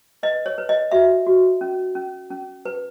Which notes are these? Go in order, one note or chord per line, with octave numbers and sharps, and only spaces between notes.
B4 D#5
C#5
B4
D#5
F#4 E5
F#4
C#4
C#4
C#4
B4